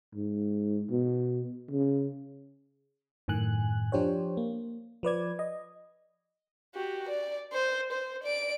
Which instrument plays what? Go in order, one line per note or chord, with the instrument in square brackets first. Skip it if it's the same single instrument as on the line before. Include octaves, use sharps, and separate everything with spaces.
[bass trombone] G#2
B2
C#3
[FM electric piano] F#2 A2 D#3 G#5 F#6
F3 D4 G4 C5 C#5
A#3
F3 B4 D5 G#6
D#5
[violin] F#4 G4
D5
C5
C5
D5 D7